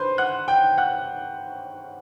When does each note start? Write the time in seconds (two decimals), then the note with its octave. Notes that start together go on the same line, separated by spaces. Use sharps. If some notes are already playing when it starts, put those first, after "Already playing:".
Already playing: D3 B4 C5 C6
0.18 F#5 F#6
0.48 G5 G6
0.78 F#5 F#6